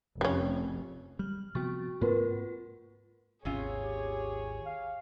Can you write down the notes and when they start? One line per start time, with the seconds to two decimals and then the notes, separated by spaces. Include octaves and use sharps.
0.21 F1 G3 C#4
1.19 G3 F6
1.55 C3 F3 B3 F#4 C#6 A6
2.01 G#2 A#3 C4 F4 A#4 B4
3.45 G#1 D#2 C3 C#4 F4 G#4 C#5
3.83 G4
4.66 F5